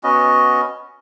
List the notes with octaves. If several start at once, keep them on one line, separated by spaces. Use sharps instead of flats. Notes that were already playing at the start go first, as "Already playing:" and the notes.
B3 C#4 F#4 D#5